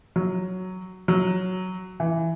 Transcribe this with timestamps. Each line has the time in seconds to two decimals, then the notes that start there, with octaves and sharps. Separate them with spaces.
0.16 F#3
1.08 F#3
2.00 E3